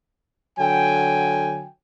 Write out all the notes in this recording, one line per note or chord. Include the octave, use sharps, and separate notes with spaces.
D3 F#3 G5 G#5